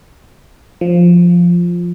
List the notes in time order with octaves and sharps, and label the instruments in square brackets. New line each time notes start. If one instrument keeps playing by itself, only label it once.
[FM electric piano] F3